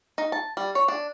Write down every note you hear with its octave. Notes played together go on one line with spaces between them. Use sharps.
D#4
A5
G3
C#5
D4